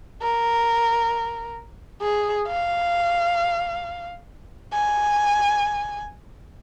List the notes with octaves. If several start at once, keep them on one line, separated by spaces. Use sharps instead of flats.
A#4
G#4
F5
G#5